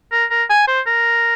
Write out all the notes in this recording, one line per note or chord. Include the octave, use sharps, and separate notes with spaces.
A#4
A#4
G#5
C5
A#4